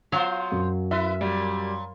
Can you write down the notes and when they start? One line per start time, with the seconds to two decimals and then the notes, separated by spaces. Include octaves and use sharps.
0.12 F#3 B3 F4 C5 F5
0.52 F#2
0.91 E4 B4 E5
1.21 A#2 G3